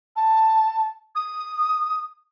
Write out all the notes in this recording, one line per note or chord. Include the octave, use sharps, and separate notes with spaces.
A5
D#6